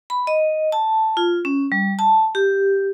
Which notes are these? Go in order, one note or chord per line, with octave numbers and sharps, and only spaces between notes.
B5
D#5
A5
F4
C#4
G3
A5
G4